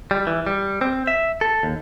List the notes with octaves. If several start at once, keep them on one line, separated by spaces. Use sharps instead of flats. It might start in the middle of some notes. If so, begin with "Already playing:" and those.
G3
E3
G3
C4
E5
A4
D#2